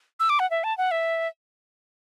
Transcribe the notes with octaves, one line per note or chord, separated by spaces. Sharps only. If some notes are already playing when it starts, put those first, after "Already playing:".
E6
D6
F#5
E5
A5
F#5
E5